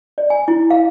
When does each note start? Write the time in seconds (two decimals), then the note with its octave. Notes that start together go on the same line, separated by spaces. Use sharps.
0.18 D5
0.30 G#5
0.48 E4
0.70 F5